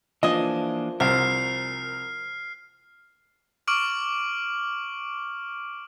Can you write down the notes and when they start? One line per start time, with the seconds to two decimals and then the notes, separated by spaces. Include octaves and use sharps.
0.23 E3 F3 A#3 D4 D#5 G#5
1.00 C2 A#4 C5 F6 C7
3.68 C#6 D6 F6 D7 F#7